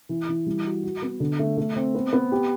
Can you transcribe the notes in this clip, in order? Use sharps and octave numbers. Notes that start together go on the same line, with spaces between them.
E3
E3
G3
F#4
F#4
B3
D3
A3
A3
C4
B3
B3
G4